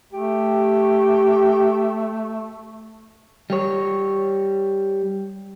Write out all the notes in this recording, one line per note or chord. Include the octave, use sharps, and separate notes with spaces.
A3 G4
G3 C#5